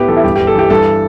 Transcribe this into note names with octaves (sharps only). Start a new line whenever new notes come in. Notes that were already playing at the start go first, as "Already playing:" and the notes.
Already playing: A2 B3 G4
E3 A4
E4
G2 G4
G1 G4
A4
E3 G4
G2 A4